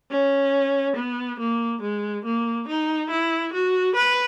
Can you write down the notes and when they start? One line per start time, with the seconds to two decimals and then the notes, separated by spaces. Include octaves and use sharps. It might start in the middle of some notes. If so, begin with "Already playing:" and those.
0.11 C#4
0.97 B3
1.40 A#3
1.82 G#3
2.25 A#3
2.68 D#4
3.10 E4
3.53 F#4
3.96 B4